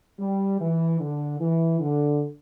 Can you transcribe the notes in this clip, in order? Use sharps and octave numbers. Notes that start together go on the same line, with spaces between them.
G3
E3
D3
E3
D3